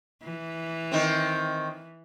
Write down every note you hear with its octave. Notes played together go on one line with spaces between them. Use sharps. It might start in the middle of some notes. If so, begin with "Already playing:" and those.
E3
D#3 C4